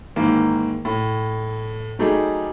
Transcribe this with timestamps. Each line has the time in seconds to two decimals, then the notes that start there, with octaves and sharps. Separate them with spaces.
0.16 G#2 D#3 E3 A#3
0.85 A2
1.99 F#3 G3 A3 D#4 G4 G#4